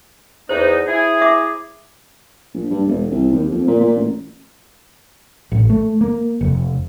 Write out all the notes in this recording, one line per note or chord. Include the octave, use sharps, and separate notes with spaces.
E2 D#4 C5
E4 G#4
E5 D6
A#1
G2
E1
C2
D#2
F2
A#2
A#2
A1
A1
A3
A#3
F1